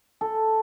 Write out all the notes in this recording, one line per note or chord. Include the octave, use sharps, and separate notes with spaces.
A4